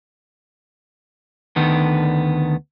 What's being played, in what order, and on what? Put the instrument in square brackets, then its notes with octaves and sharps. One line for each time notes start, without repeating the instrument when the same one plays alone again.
[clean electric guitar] D2 D3 D#3 B3